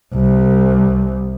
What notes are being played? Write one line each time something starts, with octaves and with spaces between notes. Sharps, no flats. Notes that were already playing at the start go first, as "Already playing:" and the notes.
C2